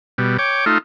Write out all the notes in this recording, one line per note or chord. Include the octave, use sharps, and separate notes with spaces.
B2 G3
C#5 G5 D6
A3 D#4 F4